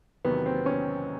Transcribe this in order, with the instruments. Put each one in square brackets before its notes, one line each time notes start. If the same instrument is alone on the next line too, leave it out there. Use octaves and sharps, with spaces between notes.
[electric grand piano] E2 C3 D#3 F#3 [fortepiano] B3
[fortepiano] C4
C#4